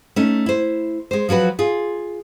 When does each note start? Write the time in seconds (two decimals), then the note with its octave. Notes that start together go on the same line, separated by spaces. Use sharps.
0.16 A3 C#4 D#4
0.46 E4 C5
1.11 G#3 C5
1.29 F3 F#3 F#4 B4
1.59 F4 G#4